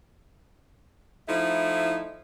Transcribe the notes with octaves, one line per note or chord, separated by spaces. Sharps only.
F3 A3 D#4 E4